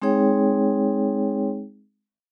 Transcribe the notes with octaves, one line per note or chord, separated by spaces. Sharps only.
G#3 C4 D#4 G#4 C#5 G5